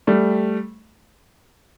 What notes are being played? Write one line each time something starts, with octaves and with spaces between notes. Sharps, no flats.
G3 A3